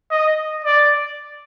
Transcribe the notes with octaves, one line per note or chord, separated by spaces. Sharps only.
D#5
D5